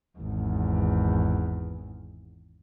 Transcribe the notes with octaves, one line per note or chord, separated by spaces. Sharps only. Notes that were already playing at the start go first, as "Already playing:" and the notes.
G#1 E2